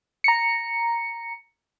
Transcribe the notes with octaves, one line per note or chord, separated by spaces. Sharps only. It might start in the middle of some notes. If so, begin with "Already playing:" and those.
A#5 C#7